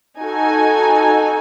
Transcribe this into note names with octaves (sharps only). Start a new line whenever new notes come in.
D#4 F#4 A4 G#5